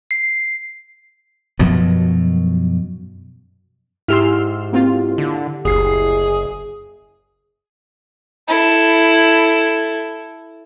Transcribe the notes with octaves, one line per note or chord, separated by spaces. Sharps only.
C7
F#2 B2 F3 F#3
G#2 E4 G4 C6 E6 F6
A#3 C4 F4
D3
F#1 D2 G#4 C7
E4 A4